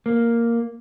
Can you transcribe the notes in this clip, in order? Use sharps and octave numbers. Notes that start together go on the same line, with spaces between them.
A#3